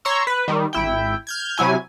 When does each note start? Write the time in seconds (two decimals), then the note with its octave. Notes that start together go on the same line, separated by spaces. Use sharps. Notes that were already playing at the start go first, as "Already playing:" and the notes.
0.05 C#5 A#5 C6 C#6 E6
0.27 B4
0.48 D#3 G3
0.73 G#1 E4 G5
1.27 F6 G6 G#6
1.58 C3 F#3 E4 G#5